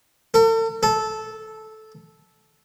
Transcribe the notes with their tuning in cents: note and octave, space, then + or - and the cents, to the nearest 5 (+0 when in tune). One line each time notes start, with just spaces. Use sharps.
A4 +45
A4 -10